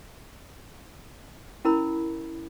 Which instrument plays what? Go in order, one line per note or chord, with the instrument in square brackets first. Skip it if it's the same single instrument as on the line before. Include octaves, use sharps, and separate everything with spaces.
[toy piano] C#4 E4 A#4 B5